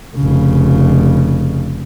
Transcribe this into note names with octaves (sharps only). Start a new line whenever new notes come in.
F1 C#3